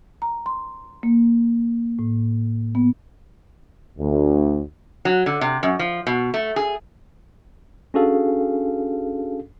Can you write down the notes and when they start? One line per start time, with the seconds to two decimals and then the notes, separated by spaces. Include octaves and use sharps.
0.22 A#5
0.46 C6
1.03 A#3
1.99 A2
2.75 B3
3.98 D2
5.05 F#3
5.26 D3
5.41 C3
5.63 F#2
5.79 F3
6.07 B2
6.34 A3
6.56 G#4
7.94 C#4 D4 F#4 G#4 A4 F5